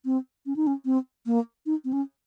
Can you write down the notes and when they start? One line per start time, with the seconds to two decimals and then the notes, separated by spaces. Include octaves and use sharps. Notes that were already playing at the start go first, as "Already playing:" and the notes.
0.05 C4
0.46 C#4
0.56 D#4
0.67 C#4
0.85 C4
1.26 A#3
1.66 D#4
1.85 C4
1.93 C#4